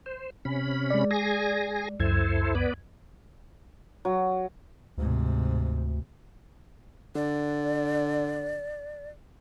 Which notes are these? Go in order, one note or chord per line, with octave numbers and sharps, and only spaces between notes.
C5
C3 C#4 B5
G#3 D5
G#4 G#5 A#6
C#2 F#2 E4 A4 C5 G#6
B3 B4 D5
F#3
D2 G#2 C3
D3 D5